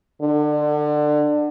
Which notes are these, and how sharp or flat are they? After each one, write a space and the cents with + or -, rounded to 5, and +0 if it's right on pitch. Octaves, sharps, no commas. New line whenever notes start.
D3 +25